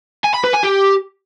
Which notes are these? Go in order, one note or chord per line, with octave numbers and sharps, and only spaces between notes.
G#5
B5
B4
G#5
G4